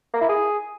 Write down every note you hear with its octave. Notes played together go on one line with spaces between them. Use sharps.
A#3
E4
G#4